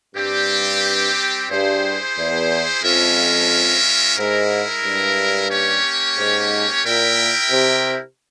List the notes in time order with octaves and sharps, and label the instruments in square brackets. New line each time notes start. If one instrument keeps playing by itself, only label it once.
[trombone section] G2 [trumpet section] G3 C4 G4
[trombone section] G2 [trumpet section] E4 G#4 C5
[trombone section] E2
[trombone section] F2 [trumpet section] G#3 C#4 F4 A#4 E5
[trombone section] G#2 [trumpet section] G#3 E4 A#4
[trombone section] G2
[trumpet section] A#3 C#4 G4 C#5
[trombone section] G#2
[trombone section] A#2 [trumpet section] E4 A#4 E5 G5
[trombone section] C3